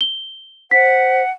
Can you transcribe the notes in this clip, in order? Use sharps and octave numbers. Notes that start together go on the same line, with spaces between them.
G7
C5 F#5 B6